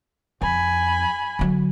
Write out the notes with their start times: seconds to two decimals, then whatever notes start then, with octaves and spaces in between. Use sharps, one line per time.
0.42 F2 G#5 B5
1.39 D3 F#3